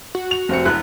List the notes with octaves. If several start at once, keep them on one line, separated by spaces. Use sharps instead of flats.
F#4
F7
F1 C4 C#7
E1 E2 F#6